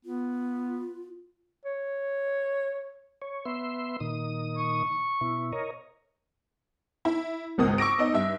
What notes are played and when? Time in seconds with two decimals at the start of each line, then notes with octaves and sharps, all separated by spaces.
0.05 B3 F4
1.65 C#5
3.22 C#5
3.45 B3 E5 C6
4.00 A#2 D#3 D#6
4.57 C#6
5.21 B2 E4
5.52 A#4 C#5 D#5
7.05 E4
7.58 G#1 C#2 A#3 D#6
7.78 C#6 D6 E6 A#6 D7
7.98 B3 D#4 D#5
8.14 G2 E5